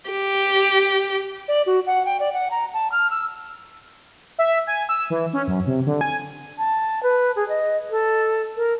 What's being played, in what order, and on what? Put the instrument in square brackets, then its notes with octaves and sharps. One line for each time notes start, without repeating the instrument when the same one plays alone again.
[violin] G4
[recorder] D5
F#4
F#5
G5
D5
F#5
A#5
A5
F6
E6
[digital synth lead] E5
G#5
E6
E3
C#4
F#2
C3
D3
G#5
[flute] A5
B4
G#4
D#5
A4
A#4